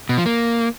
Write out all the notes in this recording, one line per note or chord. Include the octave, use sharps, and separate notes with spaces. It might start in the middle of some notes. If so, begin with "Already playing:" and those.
B2
F3
A#3